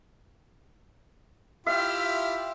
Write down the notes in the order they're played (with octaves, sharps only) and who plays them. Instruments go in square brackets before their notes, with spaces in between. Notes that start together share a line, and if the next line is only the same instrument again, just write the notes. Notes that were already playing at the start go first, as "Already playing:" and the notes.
[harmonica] E4 F4 G4 [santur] E5 [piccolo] F6